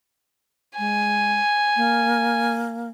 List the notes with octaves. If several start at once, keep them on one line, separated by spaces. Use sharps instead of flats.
G#3 G#5
A#3